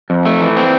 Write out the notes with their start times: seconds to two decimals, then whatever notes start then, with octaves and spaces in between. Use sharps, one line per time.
0.10 F2
0.25 A3
0.41 E3
0.57 C4